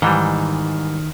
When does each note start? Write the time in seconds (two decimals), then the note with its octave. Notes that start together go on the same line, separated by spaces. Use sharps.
0.02 G#2 D#3 E3 G3